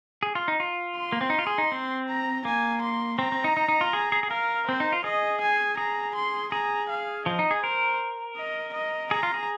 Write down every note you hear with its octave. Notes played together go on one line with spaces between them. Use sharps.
G#4
F4
D#4
F4
C6
A#3
C4
D#4
F4
G#4
D#4
C4
A#5
A#3 G#5
C6
C4 A#5
C4
D#4
D#4
D#4
F4
G#4
G#4
G#4
A#4 F5
C4 C5
D#4
F4
G#4 D#5
G#5
G#4 A#5
C6
G#4 A#5
F5
F3 D#5
D#4
G#4
A#4 C5
D#5
D#5
G#4 A#5
F4
G#4